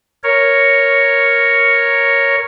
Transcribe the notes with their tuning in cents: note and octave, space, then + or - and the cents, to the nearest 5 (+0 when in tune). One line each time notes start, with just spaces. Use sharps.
A#4 +0 C#5 +0